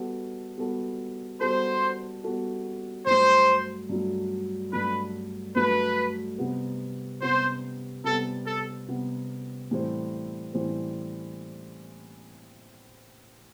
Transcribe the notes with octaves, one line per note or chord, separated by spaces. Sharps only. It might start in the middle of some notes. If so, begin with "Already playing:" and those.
Already playing: G3 B3 F#4 A4
G3 B3 F#4 A4
G3 B3 F#4 A4 C5
G3 B3 F#4 A4
G2 F#3 A3 C5
G2 F#3 A3
G2 F#3 A3 B4
G2 F#3 A3 B4
C3 G3 B3
C3 G3 B3 C5
C3 G3 B3 A4
A4
C3 G3 B3
A2 E3 G3 C4
A2 E3 G3 C4